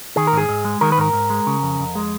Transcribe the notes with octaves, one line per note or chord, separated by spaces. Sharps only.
D#3 G#4
A#4
G#2 G#4
G#2
G#3
D#3 A#4
B4
G#2 A#4
G#2
G#3
C#3
F2
F2
G#3